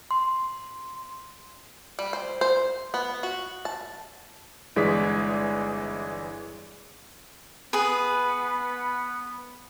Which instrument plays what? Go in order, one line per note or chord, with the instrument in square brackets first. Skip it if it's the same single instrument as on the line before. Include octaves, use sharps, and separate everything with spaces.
[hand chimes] C6
[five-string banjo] G3
C5
C5
B3
F#4
A5
[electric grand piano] G1 E3 G#3 G#4 D5 B6
[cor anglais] B3 [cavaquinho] G#4 B4